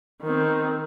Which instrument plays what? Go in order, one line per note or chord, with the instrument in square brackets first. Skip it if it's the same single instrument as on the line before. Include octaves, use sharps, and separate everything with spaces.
[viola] D#3 C4